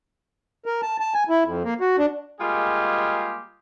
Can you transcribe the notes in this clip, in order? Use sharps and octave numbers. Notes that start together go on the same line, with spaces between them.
A#4
A5
A5
G#5
E4
F2
A#3
F#4
D4
G3 G#3 A#3 F4 G4 G#4